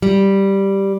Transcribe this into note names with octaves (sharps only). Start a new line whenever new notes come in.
G3